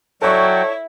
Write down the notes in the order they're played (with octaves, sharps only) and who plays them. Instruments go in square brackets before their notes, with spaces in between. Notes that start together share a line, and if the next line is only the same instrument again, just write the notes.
[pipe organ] F#3 F#4 G5 [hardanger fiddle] E4 [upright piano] A4 D5 C#6 [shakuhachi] C#5